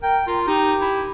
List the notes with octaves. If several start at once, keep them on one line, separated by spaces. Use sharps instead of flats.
A#4 G5
F4 A#4
D#4 G4
E4